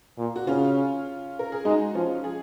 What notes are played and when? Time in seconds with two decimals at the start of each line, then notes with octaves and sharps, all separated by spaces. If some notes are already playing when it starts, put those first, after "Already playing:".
0.18 A#2
0.36 F#4
0.47 C#3 C#4 F4
1.39 A#4
1.52 G#4
1.65 G#3 D#4 F#4
1.95 F3 C#4 F4
2.24 F4 G#4